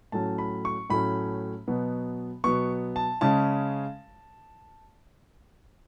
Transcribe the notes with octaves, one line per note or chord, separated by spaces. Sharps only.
A2 F#3 A3 C#4 A5
B5
C#6
A2 F#3 A3 C#4 B5
B2 F#3 B3
B2 F#3 B3 C#6
A5
C#3 G#3 C#4 A5